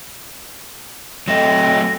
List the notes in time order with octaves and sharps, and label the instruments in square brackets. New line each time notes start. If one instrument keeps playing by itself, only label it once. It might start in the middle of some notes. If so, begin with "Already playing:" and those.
[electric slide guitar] F#3 A3 D#5 [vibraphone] C4 A4 G5 [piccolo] A#6